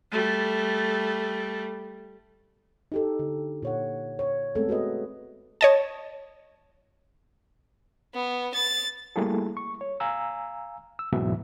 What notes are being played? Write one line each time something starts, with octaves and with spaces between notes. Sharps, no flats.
G3 A3
D#4 G4 A4
D3
A#2 C#5 F#5
C#5
G#3 A3 B3 C4 G#4 A4
F#4 G#4 B4 D#5
C#5 D#5 A5
B3
A6
G3 A3 A#3 E4 G#4 A4
C#6
C#5
F5 G#5 A#5 E6
E6
D2 G#2 B2 E3 F#3 E5